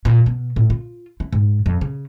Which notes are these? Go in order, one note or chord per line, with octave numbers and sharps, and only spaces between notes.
A#2
B2
A2
F4
E4
G#2
F2
C#3